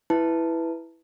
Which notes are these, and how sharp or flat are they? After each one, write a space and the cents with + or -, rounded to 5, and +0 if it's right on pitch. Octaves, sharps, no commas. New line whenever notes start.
E4 +0 B4 +0 A5 +0